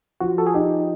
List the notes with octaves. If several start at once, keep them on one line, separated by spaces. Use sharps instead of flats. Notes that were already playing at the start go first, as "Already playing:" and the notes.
F3 F#4
A4
G#4
D#4 G4